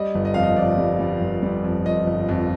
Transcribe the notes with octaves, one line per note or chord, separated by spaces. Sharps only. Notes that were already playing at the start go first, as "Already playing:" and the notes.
Already playing: G3 D#5
G1
D#5
F2 F5
D#5
F2 D5
G3
G3
G1
G3
F2
F2 D#5
G1
F2